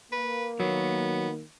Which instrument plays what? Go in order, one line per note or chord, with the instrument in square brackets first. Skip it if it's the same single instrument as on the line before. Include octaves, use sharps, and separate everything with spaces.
[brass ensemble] A#3 [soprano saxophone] B4
[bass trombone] D#3 [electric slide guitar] F#3 [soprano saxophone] B3